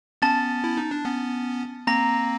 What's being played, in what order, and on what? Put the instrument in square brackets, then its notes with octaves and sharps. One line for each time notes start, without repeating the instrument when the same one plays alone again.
[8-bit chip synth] B3 C#4 [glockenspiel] A5 A6
[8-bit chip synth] E4
D#4
D4
B3 C#4
[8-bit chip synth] A#3 C4 [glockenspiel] A#5 A#6